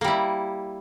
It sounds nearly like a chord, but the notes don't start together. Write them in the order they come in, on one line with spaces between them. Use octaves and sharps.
A#3 G3 E4